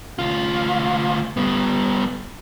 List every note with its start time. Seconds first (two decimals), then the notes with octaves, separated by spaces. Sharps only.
0.19 D2 F4
1.37 G3 B3